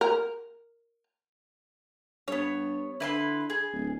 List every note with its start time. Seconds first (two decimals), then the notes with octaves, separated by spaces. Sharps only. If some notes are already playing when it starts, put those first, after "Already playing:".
0.01 A#4
2.28 G2 B3 C#5
3.00 D3 E4 B4 C6
3.50 G#4
3.73 D1